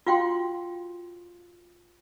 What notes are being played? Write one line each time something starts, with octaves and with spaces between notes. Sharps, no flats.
F4 F#4 F5 G5 C6